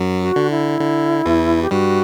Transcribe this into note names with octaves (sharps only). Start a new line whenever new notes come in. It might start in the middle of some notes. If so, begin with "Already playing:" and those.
Already playing: F#2 F#3
F#4
D3
E4
D3
E2 E3
G4
G2 G3 F#4